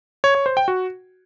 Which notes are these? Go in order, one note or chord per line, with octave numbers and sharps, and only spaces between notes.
C#5
C#5
C5
G5
F#4